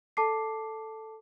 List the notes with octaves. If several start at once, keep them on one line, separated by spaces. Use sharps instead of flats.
A4 A5 D6 C7